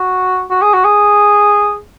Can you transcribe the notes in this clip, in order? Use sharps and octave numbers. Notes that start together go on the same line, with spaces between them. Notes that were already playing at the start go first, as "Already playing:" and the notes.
Already playing: F#4
F#4
G#4
F#4
G#4